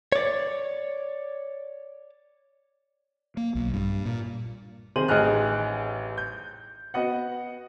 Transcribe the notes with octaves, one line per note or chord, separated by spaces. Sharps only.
C#5 D5
A#3
B1
G2
A#2
C3 D#3 G#4 C5 D#7 F#7
A1 D#4 G#4 D#5 F6 F#6
G6
B3 F#4 D#5 F#5